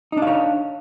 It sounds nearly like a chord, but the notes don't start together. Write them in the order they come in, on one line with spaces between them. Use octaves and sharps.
D#4 D4 F5 C#5